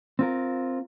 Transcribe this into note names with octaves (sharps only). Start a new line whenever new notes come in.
C4 F4 A#4